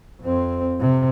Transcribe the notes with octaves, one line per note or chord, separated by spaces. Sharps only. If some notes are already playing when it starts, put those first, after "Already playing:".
F2 C4
C3